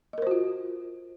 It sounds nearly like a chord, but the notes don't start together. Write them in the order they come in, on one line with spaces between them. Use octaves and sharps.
D#5 A#4 C5 F#4 F4